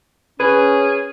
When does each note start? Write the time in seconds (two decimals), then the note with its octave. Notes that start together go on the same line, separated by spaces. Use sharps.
0.40 C#4 G#4 B4